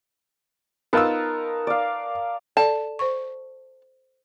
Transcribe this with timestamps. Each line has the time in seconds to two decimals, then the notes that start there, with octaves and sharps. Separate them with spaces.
0.93 B3 D#4 F4 A#4 A5 E6
1.67 D5 F5
2.57 A4 D5 A5
2.99 C5 C#6